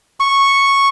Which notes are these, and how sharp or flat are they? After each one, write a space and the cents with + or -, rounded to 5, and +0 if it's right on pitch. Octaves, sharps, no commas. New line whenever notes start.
C#6 -5